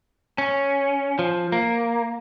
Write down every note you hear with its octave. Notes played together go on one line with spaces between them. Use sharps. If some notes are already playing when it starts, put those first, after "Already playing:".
C#4
F3
A#3